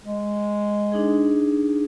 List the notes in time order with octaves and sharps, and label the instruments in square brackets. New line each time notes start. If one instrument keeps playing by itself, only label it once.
[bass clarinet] G#3
[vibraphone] D4 D#4 G#4